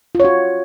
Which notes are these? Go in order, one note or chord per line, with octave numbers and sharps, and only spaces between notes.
F4 F#4 C#5